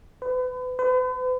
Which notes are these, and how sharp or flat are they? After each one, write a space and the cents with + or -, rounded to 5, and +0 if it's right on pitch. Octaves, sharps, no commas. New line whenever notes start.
B4 +35
B4 +45